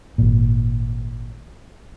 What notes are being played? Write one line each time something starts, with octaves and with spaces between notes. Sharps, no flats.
G#1 A#2